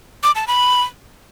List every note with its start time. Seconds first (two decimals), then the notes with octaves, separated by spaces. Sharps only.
0.23 D6
0.35 A5
0.47 B5